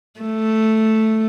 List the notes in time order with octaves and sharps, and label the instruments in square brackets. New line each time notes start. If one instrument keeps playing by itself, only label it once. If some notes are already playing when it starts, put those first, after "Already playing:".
[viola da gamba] A3